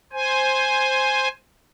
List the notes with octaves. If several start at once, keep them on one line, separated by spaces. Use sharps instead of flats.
C5 G#5